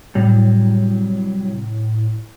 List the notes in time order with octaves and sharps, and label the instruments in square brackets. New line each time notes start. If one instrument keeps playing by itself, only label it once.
[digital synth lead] A2 [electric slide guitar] C3 F#3 G3